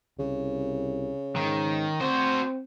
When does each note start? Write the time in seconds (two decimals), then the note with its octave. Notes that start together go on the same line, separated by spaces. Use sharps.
0.19 C2 C#3
1.36 G#2 D#3
2.01 C4 F#4 C5